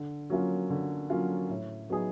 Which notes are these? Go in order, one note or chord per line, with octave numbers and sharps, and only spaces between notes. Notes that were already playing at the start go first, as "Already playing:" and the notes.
Already playing: D3
F#3 A#3 C#4 F4
D3
F#3 A#3 C#4 F4
A2
F#3 B3 D#4 G#4